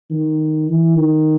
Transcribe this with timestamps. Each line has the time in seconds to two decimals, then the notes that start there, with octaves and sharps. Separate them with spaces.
0.10 D#3
0.68 E3
0.96 D#3